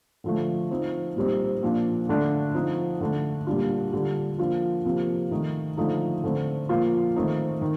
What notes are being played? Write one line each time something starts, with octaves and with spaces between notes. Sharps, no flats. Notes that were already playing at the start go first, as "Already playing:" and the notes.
D3 F3 A3
F3 C4 D#4
A#2 G3 C4 D#4
A#2 F3 A#3 D4
D3 A3 D4
F3 C4 D#4
D3 A3 D4
A#2 G3 D4 F4
D3 G3 D4 F4
F3 A#3 D4 F4
C3 F3 A#3
D#3 A3 D#4
D3 F3 A3 D#4
D3 A3 C4
A#2 F3 A#3 F4
D#3 A3 C4 D#4
D#3